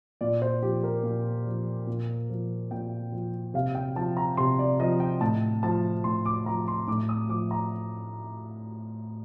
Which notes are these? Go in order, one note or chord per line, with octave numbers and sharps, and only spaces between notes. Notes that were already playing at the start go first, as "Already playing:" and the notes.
A#2 D5
C5
F3 G4
A#4
A#2
F3
A#2
F3
A#2 G5
F3
C3 F5
G5
F3 A5
A#5
C3 C6
D5
F3 D#5
G5
A2 A5
F3 A5
A2 C6
D6
F3 A#5
C6
A2 D6
D#6
F3 D6
A#5